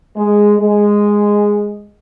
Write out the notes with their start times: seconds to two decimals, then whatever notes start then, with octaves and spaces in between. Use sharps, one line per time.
0.17 G#3
0.60 G#3